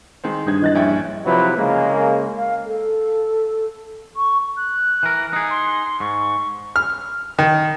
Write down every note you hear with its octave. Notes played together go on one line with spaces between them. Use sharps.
D#3 G#3 C4
G2 D#6 G6 G#6
E3 D#5 F#6 A6
A#1 C#4 E5 G5
C3 F3 F#3 E4 B4
C#3 G#3 A#3
F5
A4
C#6
F#6
E3 A#4
D#4 G#4
C6
G#2 C#6
F6
D#3